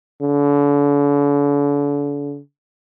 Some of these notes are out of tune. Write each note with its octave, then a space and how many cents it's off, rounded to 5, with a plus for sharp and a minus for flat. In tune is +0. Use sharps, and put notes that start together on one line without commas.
D3 -40